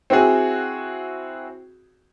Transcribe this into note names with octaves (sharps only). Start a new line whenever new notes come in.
C4 E4 F#4 G#4